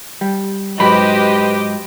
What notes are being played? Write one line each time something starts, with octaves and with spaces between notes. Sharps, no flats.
G3
G#2 F#3 G4 B4 C5 D#5 B5